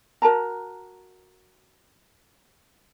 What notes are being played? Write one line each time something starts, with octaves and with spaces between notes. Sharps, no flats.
F#4 A#4 A5 A#5